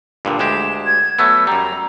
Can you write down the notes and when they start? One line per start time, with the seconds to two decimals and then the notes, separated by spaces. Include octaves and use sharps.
0.25 G2 A#2 D3
0.39 D2 G#3 G4 E7
0.86 G#6
1.19 F#3 A3 B3 E6
1.47 F#2 G3 A#5